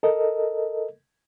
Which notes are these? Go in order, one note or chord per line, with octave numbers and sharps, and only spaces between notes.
A4 A#4 D#5